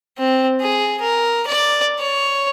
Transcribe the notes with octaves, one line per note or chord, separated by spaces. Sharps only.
C4
G#4
A#4
D5
C#5